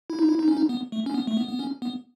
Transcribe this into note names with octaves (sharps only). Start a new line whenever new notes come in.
E4
D#4
E4
D#4
C#4
D#4
B3
A3
C#4
B3
A3
B3
B3
C#4
B3